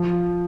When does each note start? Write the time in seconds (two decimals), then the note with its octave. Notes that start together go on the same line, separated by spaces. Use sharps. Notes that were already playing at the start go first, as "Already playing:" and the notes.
Already playing: F3